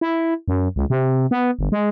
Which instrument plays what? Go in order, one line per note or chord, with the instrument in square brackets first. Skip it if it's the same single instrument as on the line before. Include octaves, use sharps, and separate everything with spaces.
[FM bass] E4
F#2
C#2
C3
B3
G1
G#3